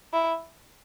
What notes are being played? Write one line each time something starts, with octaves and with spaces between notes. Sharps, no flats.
E4